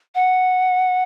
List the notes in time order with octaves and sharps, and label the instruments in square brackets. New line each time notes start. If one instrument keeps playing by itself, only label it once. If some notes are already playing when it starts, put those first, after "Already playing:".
[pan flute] F#5